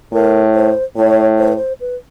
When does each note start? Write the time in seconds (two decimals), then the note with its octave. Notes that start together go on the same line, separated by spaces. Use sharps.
0.12 A2 A#4
0.54 C5
0.96 A2 C#5
1.38 C5
1.48 B4
1.56 C5
1.80 B4